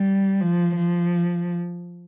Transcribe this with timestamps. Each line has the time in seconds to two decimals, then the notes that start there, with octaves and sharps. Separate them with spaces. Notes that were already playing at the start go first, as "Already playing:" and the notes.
Already playing: G3
0.41 F3
0.76 F3